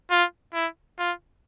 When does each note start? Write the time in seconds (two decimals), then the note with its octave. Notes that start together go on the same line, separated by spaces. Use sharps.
0.11 F4
0.54 E4
0.99 F4